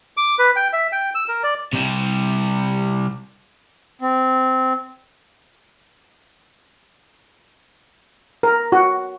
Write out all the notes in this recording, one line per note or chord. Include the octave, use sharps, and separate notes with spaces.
D6
B4
G5
E5
G5
E6
A#4
D5
C3 G3
C4
A#4
F#4